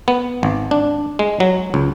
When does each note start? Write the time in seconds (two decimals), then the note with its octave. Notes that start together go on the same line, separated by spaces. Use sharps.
0.08 B3
0.43 G#1
0.71 D4
1.19 G#3
1.40 F#3
1.74 C#2